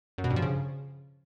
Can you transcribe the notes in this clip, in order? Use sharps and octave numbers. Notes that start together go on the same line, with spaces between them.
F#2
B2
G2
F3
C#3